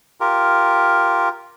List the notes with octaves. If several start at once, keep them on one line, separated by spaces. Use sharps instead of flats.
F4 G4 A#4